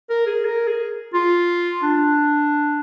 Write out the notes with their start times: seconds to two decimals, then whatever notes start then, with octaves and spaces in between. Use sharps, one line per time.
0.10 A#4
0.27 G#4
0.45 A#4
0.68 G#4
1.14 F4
1.83 D4